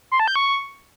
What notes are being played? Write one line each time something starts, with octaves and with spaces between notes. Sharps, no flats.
C6
A5
G6
C#6